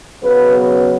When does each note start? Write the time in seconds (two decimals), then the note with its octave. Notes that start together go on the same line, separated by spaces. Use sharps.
0.22 C#3 F#3 B3 B4